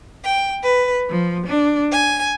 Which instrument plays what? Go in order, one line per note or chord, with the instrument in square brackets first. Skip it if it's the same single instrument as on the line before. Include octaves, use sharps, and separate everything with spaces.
[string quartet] G5
B4
F3
D4
G#5